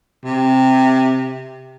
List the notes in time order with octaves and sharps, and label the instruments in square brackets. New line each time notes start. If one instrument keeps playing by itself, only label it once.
[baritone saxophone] C3